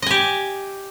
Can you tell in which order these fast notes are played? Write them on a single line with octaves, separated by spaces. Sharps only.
D#5 G#5 G4